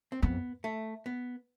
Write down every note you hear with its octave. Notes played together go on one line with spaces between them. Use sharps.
C4
F2 B3
A3
B3